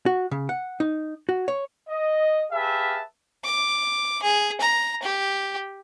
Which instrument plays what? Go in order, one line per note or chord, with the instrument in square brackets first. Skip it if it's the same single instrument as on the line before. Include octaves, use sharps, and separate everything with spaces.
[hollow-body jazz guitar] F#4
C#3
F#5
D#4
F#4
C#5
[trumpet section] D#5
G4 G#4 B4 E5 F5 A5
[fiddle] D6
G#4
A#5
G4